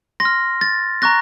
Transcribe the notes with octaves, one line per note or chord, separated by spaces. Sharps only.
C6 A#6
F6
A6
A#5 C#6 F#6 A#6